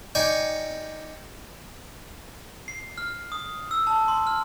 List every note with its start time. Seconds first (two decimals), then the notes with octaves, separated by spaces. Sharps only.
0.15 D#4 D5 G5 G#5 C#6
2.68 C7
2.98 F6
3.32 D#6
3.71 E6
3.87 A5
4.08 C6
4.27 F6